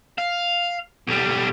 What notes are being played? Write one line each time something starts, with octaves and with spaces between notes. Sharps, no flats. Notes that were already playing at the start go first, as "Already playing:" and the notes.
F5
B1 G3